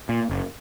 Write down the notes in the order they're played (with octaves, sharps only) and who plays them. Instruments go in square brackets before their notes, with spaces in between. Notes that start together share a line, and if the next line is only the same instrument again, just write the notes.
[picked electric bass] A#2
F#1